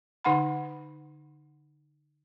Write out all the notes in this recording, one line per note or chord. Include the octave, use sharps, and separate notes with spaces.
D3 D#4 F#5 B5